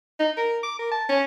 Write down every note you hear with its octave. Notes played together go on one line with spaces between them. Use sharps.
D#4
A#4
D6
A#4
A5
C#4